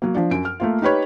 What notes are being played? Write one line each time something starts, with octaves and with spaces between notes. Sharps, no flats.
F#3 A#3
F3 D4
F#2 D7
F6
A3 A#3 F4
D#4 G4 B4 C#5